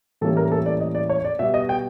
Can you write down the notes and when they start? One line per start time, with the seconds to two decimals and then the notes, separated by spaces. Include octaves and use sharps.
0.21 A2 E3 G3 A#3 C#4 A4
0.37 A#4
0.52 A4
0.66 D5
0.80 D#5
0.95 D5
1.09 C#5
1.25 D5
1.39 B2 G3 B3 E5
1.54 D#5
1.69 G5